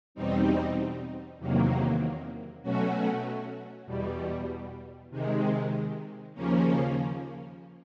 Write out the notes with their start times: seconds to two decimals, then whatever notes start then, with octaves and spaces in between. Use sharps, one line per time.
0.15 E2 B2 G3 C4 D#4
1.39 E2 C3 D#3 F#3 A#3
2.62 B2 F#3 A3 C#4 F#4
3.86 E2 B2 G3
5.10 C3 D#3 G#3
6.34 D#2 C#3 F3 A#3 C#4